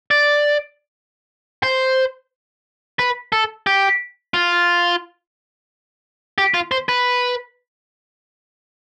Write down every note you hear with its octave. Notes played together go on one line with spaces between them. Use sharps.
D5
C5
B4
A4
G4
F4
G4
F4
C5
B4